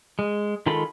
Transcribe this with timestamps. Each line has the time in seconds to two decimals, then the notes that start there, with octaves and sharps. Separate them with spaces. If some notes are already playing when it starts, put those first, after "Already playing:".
0.19 G#3
0.66 D#3 G#3 F4 A4 B5